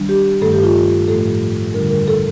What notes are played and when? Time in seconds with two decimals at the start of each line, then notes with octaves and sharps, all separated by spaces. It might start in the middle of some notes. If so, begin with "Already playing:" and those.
Already playing: D#3 G3 D4
0.09 G4
0.41 G2 D#3 A3 A4
0.53 G4
0.63 F4
1.07 A2 F3 A3 A4
1.74 F2 D3 G3 D4 F4 A#4
1.90 A#4
2.07 A4